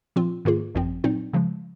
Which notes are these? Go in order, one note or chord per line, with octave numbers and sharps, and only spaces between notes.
A#2 F3 C4 F4
G#2 D#3 A#3 F4 G#4
G#1 F#2 F3 C4
A#2 F#3 C4 D#4
C#3 F3 G#3